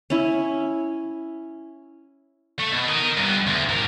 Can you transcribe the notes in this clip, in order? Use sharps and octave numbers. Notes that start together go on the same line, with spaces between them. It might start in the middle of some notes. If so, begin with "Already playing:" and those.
C#4 E4
A3
B2
A#4 D#5
G2 B3
D2
G#2 A#4